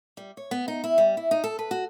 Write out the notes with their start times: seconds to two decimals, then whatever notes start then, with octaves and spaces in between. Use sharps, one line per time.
0.17 G3
0.37 C#5
0.51 B3
0.68 D#4
0.84 E4
0.98 G3
1.17 E4
1.31 D#4
1.44 A4
1.59 B4
1.71 F#4